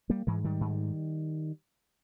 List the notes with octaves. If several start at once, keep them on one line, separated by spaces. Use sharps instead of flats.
G3 A#3
G#2 E3 G#3
D#3 G3
G#2